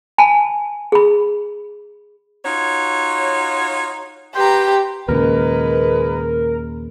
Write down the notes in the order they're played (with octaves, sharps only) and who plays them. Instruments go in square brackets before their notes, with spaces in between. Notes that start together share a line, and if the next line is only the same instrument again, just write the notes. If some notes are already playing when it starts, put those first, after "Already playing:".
[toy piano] G#5 A5 B5
G#4 B5
[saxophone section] D#4 F4 F#4 C#5
[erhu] G4 [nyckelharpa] B4 A#5 [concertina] G5 C6
[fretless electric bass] D#2 A#2 C#3 [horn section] G#3 B4 [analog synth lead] A#4